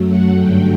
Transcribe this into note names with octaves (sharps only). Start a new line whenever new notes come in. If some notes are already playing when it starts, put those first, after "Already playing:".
Already playing: F#2 F#3 A3
F#5
G2 D3 F#3 A3 G5